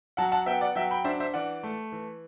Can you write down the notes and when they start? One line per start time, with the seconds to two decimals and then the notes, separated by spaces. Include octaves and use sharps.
0.17 F#3 F#5 A5
0.32 F#5 A5
0.46 B3 E5 G5
0.61 D5 F#5
0.75 F#3 E5 G5
0.91 G5 B5
1.04 D4 C5 E5
1.20 C5 E5
1.34 E3 D5 F#5
1.63 A3
1.92 E3